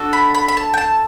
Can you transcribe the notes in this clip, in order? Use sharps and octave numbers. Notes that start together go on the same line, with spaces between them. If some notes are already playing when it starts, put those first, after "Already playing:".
Already playing: D4 F#4 A4
B5
B5
B5
A5
G5
A5